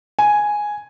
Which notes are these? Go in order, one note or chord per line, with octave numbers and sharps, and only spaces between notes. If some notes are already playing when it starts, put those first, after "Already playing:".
G#5